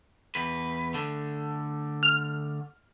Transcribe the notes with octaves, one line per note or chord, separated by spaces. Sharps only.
E2 B4
D3 A3
F6